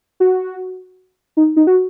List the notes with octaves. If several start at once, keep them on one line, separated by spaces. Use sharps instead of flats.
F#4
D#4
D#4
F#4